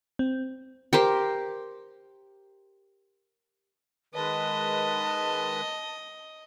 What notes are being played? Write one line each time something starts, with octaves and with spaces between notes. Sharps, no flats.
C4
G4 A#4 C5
D#3 G#3 B4 D#5 A5